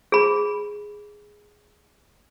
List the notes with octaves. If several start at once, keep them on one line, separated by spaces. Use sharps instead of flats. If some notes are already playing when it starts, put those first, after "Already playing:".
G#4 B5